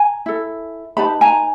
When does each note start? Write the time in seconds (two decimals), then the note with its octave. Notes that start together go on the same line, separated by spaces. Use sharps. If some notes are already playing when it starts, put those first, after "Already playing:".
Already playing: G#5 A#5
0.26 E4 A4
0.97 D#4 G4 B4 A5 B5
1.21 G#5 A#5